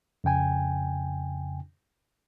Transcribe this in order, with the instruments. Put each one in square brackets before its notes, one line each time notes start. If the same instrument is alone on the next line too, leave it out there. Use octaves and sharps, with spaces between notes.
[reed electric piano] F2 C#3 G5 G#5